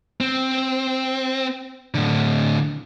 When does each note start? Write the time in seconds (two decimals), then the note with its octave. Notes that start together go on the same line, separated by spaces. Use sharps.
0.21 C4
1.94 A2 D3